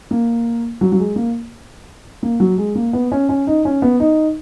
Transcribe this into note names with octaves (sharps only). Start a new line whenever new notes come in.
A#3
F#3
F#3
G#3
A#3
A#3
F#3
G#3
A#3
B3
C#4
C#4
D#4
C#4
B3
D#4